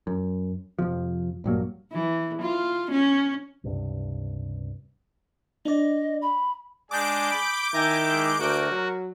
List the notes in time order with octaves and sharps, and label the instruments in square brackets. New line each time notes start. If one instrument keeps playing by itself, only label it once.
[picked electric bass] F#2
F2 C3 F3
A#1 G2 F#3 A#3
[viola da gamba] E3
F4
C#4
[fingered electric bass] C#2 G2 C3
[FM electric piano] D4 D5 [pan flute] D#5
[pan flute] B5
[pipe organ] G#3 D4 [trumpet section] G#5 D#6 [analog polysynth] D6 G6 D7
[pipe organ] B5
[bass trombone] D#3 [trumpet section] E4 E5 A#5 [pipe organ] G#5 A#6
[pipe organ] G#3
[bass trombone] D2 [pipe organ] F#4 [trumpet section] A#4
[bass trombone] F#3